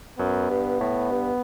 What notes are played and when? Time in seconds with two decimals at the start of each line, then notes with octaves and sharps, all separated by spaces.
0.19 F#2 B3
0.50 G2
0.80 A2
1.11 G2